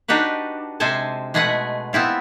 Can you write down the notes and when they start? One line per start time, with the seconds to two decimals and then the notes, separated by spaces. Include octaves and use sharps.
0.08 D4 D#4 F#4 G4 B4
0.80 C3 G#3 A4 C5 G#5 A5
1.34 B2 G#3 A3 G#4 B4 F#5
1.93 B3 C4 E4 F4